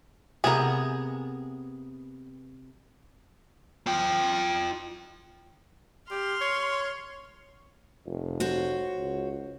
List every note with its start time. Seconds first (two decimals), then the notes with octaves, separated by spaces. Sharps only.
0.44 C3 B3 G#4 A#4
3.87 F4 G5
6.11 G4 C6 F6
6.41 C#5
8.06 F1
8.40 F#4 C5 C#5
8.98 C#2